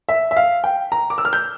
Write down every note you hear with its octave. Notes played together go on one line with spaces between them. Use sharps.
E5
E5
F5
G5
A#5
D6
E6
F6
G6